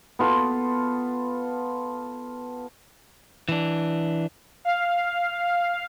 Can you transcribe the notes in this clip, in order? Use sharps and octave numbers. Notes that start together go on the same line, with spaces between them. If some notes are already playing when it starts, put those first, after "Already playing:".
B3 F4 A4
E3 D4
F5